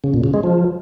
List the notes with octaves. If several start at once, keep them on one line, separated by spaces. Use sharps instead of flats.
C#3
A#2
C#3
G#3
F3